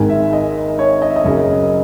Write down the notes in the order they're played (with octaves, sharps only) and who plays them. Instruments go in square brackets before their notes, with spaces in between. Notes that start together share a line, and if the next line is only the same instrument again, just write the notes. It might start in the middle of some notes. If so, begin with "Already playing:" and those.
Already playing: [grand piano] G#1 G#2 D#3 G#5
E5
D#5
C#5
D#5
E5
D#5
F#1 F#2 C#3 F#3